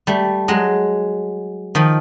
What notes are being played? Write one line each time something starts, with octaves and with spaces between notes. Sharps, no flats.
G3 A3
F#3 G#3
D#3 F3